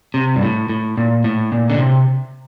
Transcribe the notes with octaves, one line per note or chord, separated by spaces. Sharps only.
C3
G2
A2
A2
A#2
A2
A#2
D3
C3